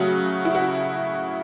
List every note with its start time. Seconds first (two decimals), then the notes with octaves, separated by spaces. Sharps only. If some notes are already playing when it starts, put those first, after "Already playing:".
Already playing: C#3 F#3 A3 F#4
0.45 E4
0.55 F#4